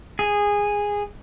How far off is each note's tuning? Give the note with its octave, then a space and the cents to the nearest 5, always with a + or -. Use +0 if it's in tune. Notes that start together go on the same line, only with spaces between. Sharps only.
G#4 -15